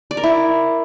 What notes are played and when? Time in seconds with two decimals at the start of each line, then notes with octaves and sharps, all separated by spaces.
0.11 D5
0.17 A#4
0.23 E4